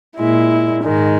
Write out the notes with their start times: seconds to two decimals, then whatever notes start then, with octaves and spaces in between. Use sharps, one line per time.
0.19 A#2 G#3 E4
0.83 G#2 D#3 G#3